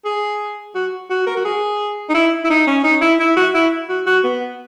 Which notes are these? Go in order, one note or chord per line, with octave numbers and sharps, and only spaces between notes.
G#4
F#4
F#4
A#4
F#4
G#4
D#4
E4
E4
D#4
C#4
D#4
E4
E4
F#4
E4
F#4
F#4
B3